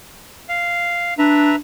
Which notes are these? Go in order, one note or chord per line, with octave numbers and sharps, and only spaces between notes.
F5
D4 B4 E5 A#5